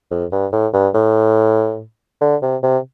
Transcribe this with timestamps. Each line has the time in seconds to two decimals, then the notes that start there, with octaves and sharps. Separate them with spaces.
0.11 F2
0.32 G2
0.53 A2
0.74 G2
0.94 A2
2.21 D3
2.42 C3
2.63 C3